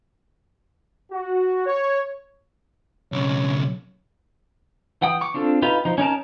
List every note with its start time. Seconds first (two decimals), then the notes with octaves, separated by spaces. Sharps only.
1.12 F#4
1.66 C#5
3.12 B1 C#3 C#5
5.01 E3 F#5 G5 D#6
5.21 C#6 D6
5.34 C4 D4 F4 A4
5.62 D#4 F4 G4 B4
5.85 F3 D#4
5.98 C#4 D#4 A#4 A5